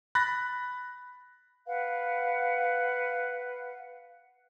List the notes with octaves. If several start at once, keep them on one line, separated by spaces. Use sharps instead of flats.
B5 F#6 A6 A#6
B4 F5 F#5